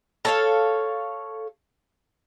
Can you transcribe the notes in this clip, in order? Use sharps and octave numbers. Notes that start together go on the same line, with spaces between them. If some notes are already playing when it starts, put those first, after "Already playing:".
A4 C#5 F5